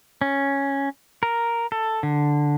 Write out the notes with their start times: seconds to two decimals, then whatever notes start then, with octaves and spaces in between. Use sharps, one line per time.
0.21 C#4
1.23 A#4
1.72 A4
2.03 D3